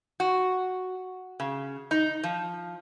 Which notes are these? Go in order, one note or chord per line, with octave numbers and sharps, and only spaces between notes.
F#4
C#3
D#4
F3